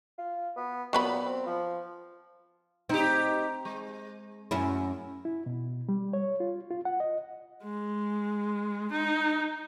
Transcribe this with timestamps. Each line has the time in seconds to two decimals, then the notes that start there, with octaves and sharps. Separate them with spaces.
0.18 F4
0.56 B3
0.93 A#2 F#3 B3 B5
1.25 C4
1.46 F3
2.89 C4 D#4 G4
3.65 G#3
4.51 F#2 C#4 E4
5.25 E4
5.46 B2
5.89 G3
6.13 C#5
6.40 F4
6.71 F4
6.85 F#5
7.00 D#5
7.64 G#3
8.92 D#4